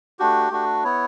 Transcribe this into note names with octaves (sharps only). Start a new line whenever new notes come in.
A3 D4 F#4 G4
A3 D4 F#4
B3 E4 C#5